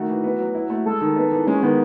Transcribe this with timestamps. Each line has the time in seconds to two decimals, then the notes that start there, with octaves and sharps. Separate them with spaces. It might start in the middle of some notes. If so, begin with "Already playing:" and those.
Already playing: D#3 A3 F#4
0.09 E3
0.24 B3
0.39 F#3
0.55 E4
0.70 A3
0.86 G#3 A4
1.01 D#3
1.16 B3
1.32 E3
1.47 G#3 C#4
1.63 D#3 B3